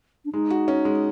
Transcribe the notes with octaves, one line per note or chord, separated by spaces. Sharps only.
D4
G#3 D#4
F#4
C#4
G#3